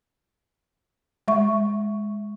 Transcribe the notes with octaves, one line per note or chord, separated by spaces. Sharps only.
G#3 E5 C#6